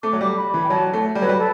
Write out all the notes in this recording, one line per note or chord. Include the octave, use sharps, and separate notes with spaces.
A3 D6
F#3
G3
B5
E3
G5
F#3 A5
A3
G3
F#3 B4
G3
A4